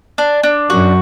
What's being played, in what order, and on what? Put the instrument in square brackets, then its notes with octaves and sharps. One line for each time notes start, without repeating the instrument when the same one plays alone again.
[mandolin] D4
D4
[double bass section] F#2 [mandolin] F#4